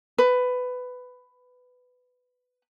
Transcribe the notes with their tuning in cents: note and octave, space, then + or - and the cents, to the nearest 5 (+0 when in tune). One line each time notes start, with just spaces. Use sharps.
B4 +15